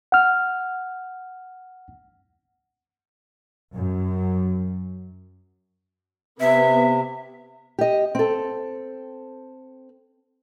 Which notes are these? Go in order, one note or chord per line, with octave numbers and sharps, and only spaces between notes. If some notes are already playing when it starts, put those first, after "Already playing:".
F#5 F6
F#2
C3 B3 E5
G4 D#5
C4 A4